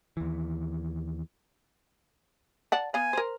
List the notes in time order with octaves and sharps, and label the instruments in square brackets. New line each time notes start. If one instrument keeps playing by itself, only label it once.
[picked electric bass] D#2 E3
[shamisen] D5 F#5 A5
[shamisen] B3 F5 [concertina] G#5
[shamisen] A#4 C5